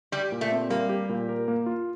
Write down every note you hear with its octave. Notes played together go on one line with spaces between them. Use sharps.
G3 G4
A#2
A3
C4
G3 A#3
G4
A#2
A#4
A#3
F4